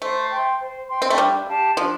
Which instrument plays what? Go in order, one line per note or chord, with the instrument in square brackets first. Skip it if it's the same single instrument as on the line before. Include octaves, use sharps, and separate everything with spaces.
[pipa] A3 [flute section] C5
[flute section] G5 C6
C5
G5 C6
[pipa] C4
A3
[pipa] G3 [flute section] D4
[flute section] G4 F5 A5
[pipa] F3 [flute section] D4